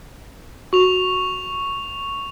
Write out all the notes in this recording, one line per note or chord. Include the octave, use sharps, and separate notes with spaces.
F#4 C#6 F7